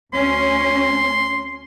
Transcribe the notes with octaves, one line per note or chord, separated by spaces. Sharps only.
D2 C#4 C6